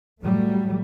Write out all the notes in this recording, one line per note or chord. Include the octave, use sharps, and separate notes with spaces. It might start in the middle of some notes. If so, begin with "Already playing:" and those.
A2 F#3 G3 A3